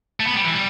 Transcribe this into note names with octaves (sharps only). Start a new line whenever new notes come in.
A3
B3
G3
E3
G3